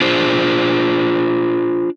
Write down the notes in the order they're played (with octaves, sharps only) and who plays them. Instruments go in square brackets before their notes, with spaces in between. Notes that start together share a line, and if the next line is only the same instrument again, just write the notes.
[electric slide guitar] D4 F4 G#4 C5